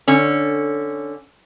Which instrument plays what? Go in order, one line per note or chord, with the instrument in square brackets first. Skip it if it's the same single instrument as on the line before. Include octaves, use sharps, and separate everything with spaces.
[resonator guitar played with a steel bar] D3 C#4